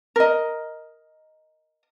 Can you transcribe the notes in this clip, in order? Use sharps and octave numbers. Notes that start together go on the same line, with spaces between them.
A#4 D#5